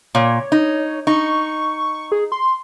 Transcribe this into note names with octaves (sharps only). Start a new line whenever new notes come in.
A#2 C#5
D#4
D#4 C#6
G#4
C6